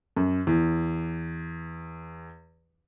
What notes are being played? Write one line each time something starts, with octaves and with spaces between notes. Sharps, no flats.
F#2
E2